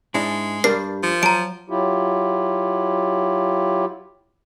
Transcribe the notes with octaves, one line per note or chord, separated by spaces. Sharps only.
G#2 G#3 D4 E4
G2 G3 D4 G4 A#4 D5 C7
F3
F#3 A5 A#5 D7
F#3 E4 F4 G4